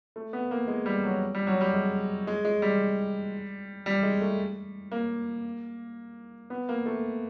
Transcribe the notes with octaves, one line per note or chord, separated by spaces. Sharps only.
A3
B3
A#3
G#3
G3
F#3
G3
F#3
G3
G#3
G#3
G#3
G3
G3
G#3
A3
A#3
B3
A#3
A3